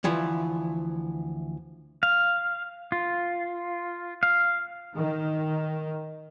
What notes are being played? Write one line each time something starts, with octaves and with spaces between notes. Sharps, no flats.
D2 E3 F3
F5
F4
F5
D#3